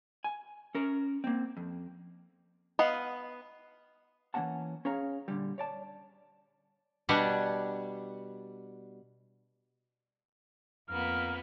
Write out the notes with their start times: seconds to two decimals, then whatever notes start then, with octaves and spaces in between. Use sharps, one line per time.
0.24 G#5
0.75 C#4 A#4
1.24 A#3 C4
1.57 F2
2.79 B3 D#5 F5 F#5
4.34 E3 G#3 A#3 C#4 F#5 A5
4.85 C#4 G#4 C#5 F5 A#5
5.28 A#2 D3 G3
5.58 C#5 D5 A5
7.09 B2 G3 D4 D5 F#5 G#5
10.88 F2 A#3 B3 F6